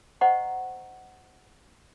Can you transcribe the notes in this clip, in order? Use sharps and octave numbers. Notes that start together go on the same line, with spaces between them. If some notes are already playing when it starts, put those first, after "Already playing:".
C5 D#5 F#5 A#5 C#6